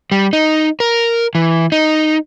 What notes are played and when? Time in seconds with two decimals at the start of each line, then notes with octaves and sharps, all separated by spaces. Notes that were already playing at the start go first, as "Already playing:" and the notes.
0.12 G3
0.33 D#4
0.80 A#4
1.35 E3
1.72 D#4